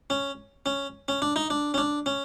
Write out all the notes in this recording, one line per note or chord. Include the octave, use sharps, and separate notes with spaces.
C#4
C#4
C#4
D4
D#4
D4
C#4
D4
C#4